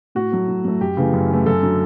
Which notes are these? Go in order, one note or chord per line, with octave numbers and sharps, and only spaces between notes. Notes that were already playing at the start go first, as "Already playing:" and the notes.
A2 F#4
F#3 A3
A2
F#3 A3
F#2 G4
C#3 E3 A3
F#2
C#3 E3 A3
F#2 A4
D3 F#3